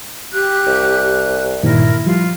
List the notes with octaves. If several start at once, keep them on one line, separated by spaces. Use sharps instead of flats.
G4 F#6
C2
G2 A#2 D#3 E4 A#4
F3 G3 F4